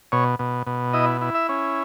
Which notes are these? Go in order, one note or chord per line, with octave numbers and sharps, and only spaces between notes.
B2 C#5
B2
B2
E4 D#5
E4
E5
C#4